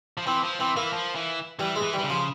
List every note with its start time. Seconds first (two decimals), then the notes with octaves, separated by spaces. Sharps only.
0.17 F3
0.27 E3 C4
0.43 F3
0.60 E3 C4
0.76 E3 A#3
0.93 F3
1.15 E3
1.59 E3 G3
1.76 G#3
1.82 E3
1.93 G3
1.99 E3
2.04 C#3
2.10 F3